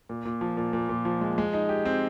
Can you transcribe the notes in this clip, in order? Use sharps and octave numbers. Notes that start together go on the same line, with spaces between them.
A#2
A#2
F3
A#2
A#2
A#2
F3
G#3
G#3
D#4
G4
C4